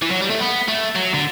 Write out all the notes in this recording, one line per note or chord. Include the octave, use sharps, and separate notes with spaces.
E3
F#3
G3
A3
B3
A3
F#3
D3